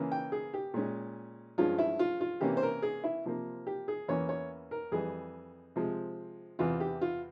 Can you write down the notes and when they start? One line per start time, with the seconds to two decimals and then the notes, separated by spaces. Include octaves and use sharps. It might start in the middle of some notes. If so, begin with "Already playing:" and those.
Already playing: C#3 E3 A#3 C#4
0.12 G5
0.32 G#4
0.54 G4
0.74 A#2 G#3 C#4
1.58 G2 F3 G#3 C#4 F4
1.78 E4
1.99 F4
2.21 F4
2.41 C3 E3 A#3 C#4 G4
2.57 C5
2.63 A#4
2.82 G#4
3.04 E4
3.25 C3 F3 A#3
3.67 G4
3.88 G#4
4.08 E2 E3 A#3 C#4 C#5
4.29 C#5
4.71 A#4
4.92 F2 E3 G3 G#4
5.76 C3 F3 G#3
6.59 E2 C3 E3 F4
6.80 G4
7.01 F4